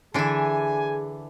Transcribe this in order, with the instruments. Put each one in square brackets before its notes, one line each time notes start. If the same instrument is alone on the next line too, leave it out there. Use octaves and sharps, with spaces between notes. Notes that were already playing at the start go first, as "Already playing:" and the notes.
[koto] D3 D4 [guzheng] E3 E5 [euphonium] G#4 [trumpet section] G#5